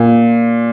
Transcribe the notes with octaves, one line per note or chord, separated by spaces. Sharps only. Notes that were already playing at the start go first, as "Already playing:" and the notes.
Already playing: A#2